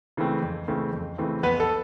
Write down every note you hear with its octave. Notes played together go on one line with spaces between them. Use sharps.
C#3 E3 A3 C4
F2
C#3 E3 A3 C4
F2
C#3 E3 A3 C4
F2 B3 B4
A4